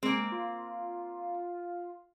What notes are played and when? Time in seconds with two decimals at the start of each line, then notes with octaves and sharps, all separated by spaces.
0.03 G#3 A#3 C4
0.32 F4